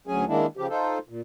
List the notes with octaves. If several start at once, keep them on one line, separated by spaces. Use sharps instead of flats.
D2 F#3 C#4 G#4 G#5
D#3 G#3 A#3 D4 E4
C#3 F3 G4
D#4 F4 A4 C5
A#2